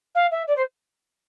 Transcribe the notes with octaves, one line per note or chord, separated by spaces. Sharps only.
F5
E5
D5
C5